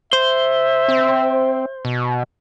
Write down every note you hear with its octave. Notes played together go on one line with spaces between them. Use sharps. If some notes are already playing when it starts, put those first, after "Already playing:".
C5 E5
C4
B2